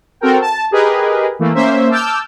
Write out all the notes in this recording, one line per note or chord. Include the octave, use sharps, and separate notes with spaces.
C4 F#4 A4 A#4 G5
A5
G4 G#4 A#4 B4 D#5
E3 A3 A#3
A#3 C#4 C5 E5
A5 D6 E6 F6 G6